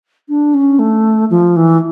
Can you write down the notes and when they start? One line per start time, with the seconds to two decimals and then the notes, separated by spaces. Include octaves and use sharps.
0.29 D4
0.54 C#4
0.79 A3
1.30 F3
1.56 E3